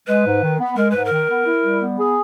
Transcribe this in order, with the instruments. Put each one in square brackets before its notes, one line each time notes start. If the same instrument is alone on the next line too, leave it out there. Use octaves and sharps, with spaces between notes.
[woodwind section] G#3 [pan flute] B4
[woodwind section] G#2
D#3
B3
[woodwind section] G#3 [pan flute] A#4
[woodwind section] G#2 [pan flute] B4
[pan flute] A#4
[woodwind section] D#3
B3
E4
G3
B3
G#4